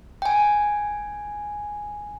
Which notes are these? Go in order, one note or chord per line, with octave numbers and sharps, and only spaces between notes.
G5 G#5